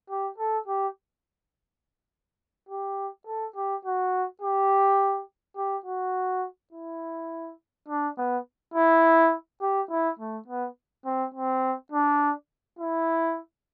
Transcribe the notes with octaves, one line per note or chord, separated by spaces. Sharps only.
G4
A4
G4
G4
A4
G4
F#4
G4
G4
F#4
E4
D4
B3
E4
G4
E4
A3
B3
C4
C4
D4
E4